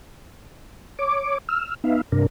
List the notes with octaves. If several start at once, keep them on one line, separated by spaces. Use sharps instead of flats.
C#5 D6
E6 F6
B3 D#4 E5 F5
G2 C3 D4 A#4